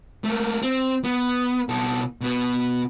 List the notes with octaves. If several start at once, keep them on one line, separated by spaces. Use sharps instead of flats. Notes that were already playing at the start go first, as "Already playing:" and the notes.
A3 A#3
C4
B3
B2 A4
B2 B3